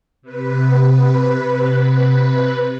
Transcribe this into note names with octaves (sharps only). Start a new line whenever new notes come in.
C3 B4